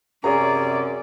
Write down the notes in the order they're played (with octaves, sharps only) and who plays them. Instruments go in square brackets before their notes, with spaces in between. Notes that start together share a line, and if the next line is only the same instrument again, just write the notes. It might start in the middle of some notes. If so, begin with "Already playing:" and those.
[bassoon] F#2 [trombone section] C3 C#4 [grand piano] G#4 A#5 [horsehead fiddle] D5